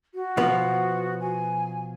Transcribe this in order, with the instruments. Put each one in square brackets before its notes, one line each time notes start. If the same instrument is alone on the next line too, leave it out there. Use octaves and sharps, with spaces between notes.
[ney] F#4
[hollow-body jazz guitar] B2 F3 B3
[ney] G#5